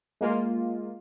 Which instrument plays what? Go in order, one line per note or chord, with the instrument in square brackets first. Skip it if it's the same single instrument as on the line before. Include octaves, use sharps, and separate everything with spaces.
[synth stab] G#3 A#3 F4